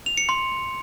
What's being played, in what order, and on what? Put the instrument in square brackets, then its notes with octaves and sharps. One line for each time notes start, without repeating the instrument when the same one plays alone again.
[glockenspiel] F7
C#7
C6